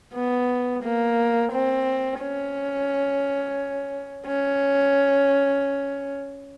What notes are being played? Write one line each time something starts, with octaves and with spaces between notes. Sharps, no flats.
B3
A#3
C4
C#4
C#4